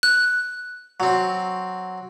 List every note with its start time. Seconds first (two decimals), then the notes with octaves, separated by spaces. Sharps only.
0.03 F#6
1.00 F#3 C4